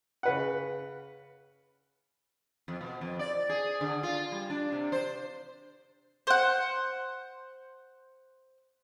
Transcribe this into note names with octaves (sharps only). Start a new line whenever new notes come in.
C#3 B4 F#5
F2
B2
F2
D5
G#4
D3
F4
G3
D4
C3
C5
C5 F#5